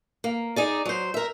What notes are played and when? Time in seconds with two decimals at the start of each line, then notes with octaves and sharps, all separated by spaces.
0.24 A#3
0.56 D#4 G#4 D5
0.85 F#3 C5
1.14 A#4 E5